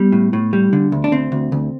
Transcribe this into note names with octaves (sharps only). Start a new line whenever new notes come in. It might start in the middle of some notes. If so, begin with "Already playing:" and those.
Already playing: G3 B3
A2
A2
G3
D3
D2
D4
D2 C4
D2
D2